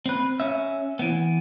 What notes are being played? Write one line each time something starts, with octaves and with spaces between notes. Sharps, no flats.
C4 B4
C#4 E5
E3 B3